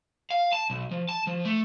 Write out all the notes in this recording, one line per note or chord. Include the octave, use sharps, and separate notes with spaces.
F5
A5
B1
F3
A5
F3
A3